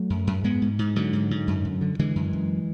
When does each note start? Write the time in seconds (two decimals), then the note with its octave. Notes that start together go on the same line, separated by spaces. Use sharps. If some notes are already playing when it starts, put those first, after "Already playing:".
Already playing: F#3 A3
0.10 F#2
0.27 F#2
0.44 G#2 G#3 B3
0.62 G#2
0.79 G#2
0.96 G#2 D3 F#3
1.13 G#2
1.31 G#2
1.47 F#2
1.65 F#2
1.81 D3
1.99 D3 E3 G#3
2.16 F#2
2.33 F#2